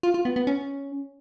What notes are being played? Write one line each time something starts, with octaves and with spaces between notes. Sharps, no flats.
F4
F4
B3
B3
C#4